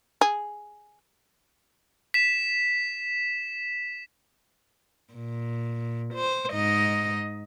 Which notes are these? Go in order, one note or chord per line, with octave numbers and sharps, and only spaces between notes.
G#4
B6 E7
A#2
C5
G#2 D#4 D#5